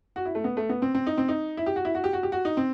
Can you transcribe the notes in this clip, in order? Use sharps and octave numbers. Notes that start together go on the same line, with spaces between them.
F#4
E4
A3
B3
A3
B3
C4
C4
D#4
C4
D#4
E4
G4
F#4
E4
F#4
G4
F#4
G4
F#4
D#4
C4